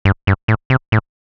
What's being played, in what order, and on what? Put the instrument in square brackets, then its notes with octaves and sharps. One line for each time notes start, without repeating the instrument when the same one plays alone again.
[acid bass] G2
G2
A2
C3
A2